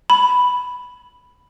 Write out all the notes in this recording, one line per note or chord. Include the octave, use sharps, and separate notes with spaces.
B5